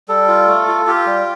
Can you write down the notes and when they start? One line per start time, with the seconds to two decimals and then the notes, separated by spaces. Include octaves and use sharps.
0.08 G3 A4
0.28 F4
0.47 A3
0.67 F4
0.86 F4 G4
1.06 G3